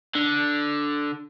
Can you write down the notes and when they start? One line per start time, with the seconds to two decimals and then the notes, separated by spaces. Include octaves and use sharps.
0.15 D3